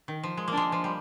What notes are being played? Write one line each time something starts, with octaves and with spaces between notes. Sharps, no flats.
D#3
F3
G#3
A#3 D4
G#3
F3
G3